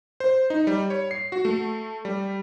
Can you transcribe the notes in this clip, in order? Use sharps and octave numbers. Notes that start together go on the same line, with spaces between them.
C5
D#4
G3
C#5
C7
F#4
A3
G3